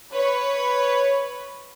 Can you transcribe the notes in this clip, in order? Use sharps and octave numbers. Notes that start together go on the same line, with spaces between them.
B4 C#5